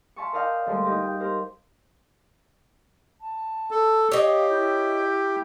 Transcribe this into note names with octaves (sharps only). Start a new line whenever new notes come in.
E5 F5 G#5 A5 C6 C#6
A#4 D5 D#5 F5 G5 D6
D2 G3 G#3 C6
D#4 G4 D#5
G5
G4 A#4 C5
A5
A4
G4 C#5 D#5 F5 G5
E4 G5 G6